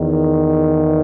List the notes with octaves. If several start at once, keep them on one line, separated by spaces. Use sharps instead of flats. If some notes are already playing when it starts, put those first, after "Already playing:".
Already playing: E2 D#3